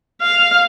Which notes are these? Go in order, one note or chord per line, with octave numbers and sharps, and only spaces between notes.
F5